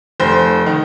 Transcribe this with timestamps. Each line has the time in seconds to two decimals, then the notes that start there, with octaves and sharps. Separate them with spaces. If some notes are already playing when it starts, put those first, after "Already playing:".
0.20 F1 C5
0.66 D#3